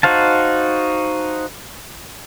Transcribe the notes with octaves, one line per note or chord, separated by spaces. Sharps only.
D#4 F#4 C5 F5 A5